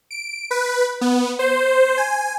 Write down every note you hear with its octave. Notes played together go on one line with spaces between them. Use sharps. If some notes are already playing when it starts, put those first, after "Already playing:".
D7
B4
B3
C5
G#5